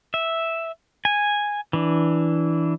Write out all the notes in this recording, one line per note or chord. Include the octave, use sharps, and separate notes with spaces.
E5
G#5
E3 D4